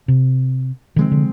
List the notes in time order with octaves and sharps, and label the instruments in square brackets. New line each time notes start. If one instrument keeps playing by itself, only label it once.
[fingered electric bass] C3
[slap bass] C3 F3 G#3 C4 [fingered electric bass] D#3
[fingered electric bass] D3